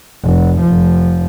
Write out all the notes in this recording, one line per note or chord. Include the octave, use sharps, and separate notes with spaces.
F1
F1 F3